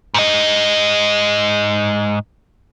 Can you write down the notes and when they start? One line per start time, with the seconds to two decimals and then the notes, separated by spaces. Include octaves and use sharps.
0.14 G#2 D#5